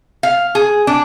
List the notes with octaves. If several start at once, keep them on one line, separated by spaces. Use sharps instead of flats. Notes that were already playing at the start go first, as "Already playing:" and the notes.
F5
G#4
D4